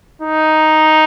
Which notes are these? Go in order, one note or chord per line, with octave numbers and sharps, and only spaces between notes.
D#4